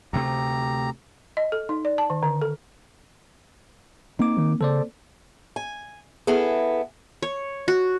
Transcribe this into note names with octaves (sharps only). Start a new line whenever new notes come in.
D2 C3 A3 G4 A#5
D#5
A4
D#4
D5
A5
D#3
D3
A4
A#3 C4 D#4 D6
D#3
C#3 A4 C5 D5
G#5
B3 E4 G#4 A4
C#5
F#4